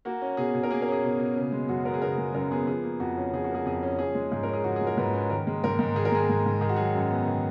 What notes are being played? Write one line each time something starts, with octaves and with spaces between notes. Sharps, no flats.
A#3 F#4
C#4
B2 G#4
B2
A#4
A#3 G#4
A#4
C#4 G#4
B2
B2
C#3
G#3
F#2 F#4
B3 A#4
G#4
C#3 A#4
G#3
F#2 A#4
B3 G#4
F3 G#4
A#3
F2 F#4
C#4
F3 G#4
F#4
A#3 G#4
F2 G#4
C#4
F3 G#4
G#3
G#2 G#4
A#4
C#4 G#4
F3 F#4
G#3 G#4
A#4
G#2 B4
C#4
D#3 A#4
G#3
G#2 A#4
G#2
D#3 G#4
A#4
G#3 G#4
G#2
G#2
D#3 G#4
F#4
F#3 G#4
F#2
B3
D#3